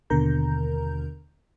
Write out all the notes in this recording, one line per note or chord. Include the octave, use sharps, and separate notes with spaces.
D#2 B2 D3 A#4 A#5 G6